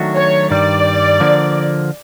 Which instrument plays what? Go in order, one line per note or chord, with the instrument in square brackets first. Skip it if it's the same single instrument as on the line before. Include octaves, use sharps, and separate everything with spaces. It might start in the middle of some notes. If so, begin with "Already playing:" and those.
Already playing: [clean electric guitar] D#3 F#3 A3 D4 F#4
[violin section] C#5
[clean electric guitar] G2 D#3 G3 [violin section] D5
[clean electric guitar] D3 F3 A#3